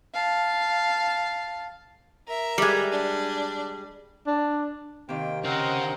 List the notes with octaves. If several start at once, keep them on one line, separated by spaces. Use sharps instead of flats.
F5 A5
A#4 E5
G3 G#3
D4
D4
C3 D#3 A#3 G5
C#3 C4 A#4 C5 D#5 F#5